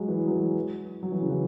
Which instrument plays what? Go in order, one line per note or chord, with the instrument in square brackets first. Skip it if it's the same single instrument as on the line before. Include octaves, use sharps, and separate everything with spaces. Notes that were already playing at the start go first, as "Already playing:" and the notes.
Already playing: [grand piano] F#3 G#3
E3
F#3
E3
F#3
E3
C#3
E3